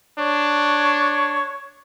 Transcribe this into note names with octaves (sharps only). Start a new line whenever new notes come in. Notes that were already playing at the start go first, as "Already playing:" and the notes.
D4 C#5